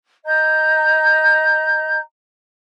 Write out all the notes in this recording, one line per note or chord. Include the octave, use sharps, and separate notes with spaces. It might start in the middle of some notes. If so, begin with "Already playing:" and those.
D#5 A#5 G6